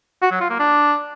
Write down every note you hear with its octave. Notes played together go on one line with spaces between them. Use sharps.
F#4
F#3
F4
A#3
D4